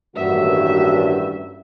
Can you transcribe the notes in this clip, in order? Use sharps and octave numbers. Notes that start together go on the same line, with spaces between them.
A1 G2 D#3 A#3 F#4 E5